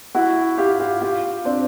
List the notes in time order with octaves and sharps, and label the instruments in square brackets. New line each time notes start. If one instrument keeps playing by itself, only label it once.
[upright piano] E4 F#4
F4 G4
F4 G4
F4 G4
C4 D4